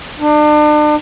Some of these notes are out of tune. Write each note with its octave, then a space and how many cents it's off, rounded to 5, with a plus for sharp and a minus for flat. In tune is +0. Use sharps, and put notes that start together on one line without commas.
D4 +35